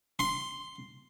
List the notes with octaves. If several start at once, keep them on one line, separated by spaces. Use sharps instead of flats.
C6